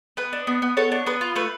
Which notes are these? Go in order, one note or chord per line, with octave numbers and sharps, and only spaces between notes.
B3 B4
D4
B3
B3
B3 A4 C#5
D4
B3 B4
F4
A3 B4